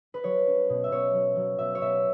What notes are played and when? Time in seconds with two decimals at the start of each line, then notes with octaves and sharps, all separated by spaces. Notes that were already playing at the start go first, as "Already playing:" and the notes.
0.14 B4
0.24 F#3 C#5
0.47 C#4
0.69 B2
0.84 E5
0.91 B2 C#5
1.14 F#3
1.36 F#3
1.58 B2 E5
1.75 C#5
1.81 B2 E5